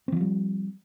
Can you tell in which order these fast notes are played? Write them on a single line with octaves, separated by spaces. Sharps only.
C4 E3 F3 G3